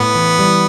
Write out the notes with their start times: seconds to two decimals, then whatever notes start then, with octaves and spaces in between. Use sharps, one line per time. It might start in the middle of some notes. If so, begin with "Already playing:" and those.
Already playing: A2 B3
0.15 E3
0.39 G3